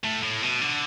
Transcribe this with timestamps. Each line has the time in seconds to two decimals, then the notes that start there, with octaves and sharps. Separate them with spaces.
0.04 A2
0.23 A2
0.42 B2
0.62 D3